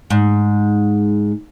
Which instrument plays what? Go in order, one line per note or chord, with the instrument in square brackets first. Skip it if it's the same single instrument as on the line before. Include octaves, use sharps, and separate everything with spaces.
[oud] G#2